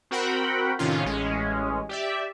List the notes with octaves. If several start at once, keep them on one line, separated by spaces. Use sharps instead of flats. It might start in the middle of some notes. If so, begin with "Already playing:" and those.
C4 F#4 A#4 F#5 G5 B5
A2 C3 D#3 C#4 F4
A1 G#3 C#4
G4 D5 E5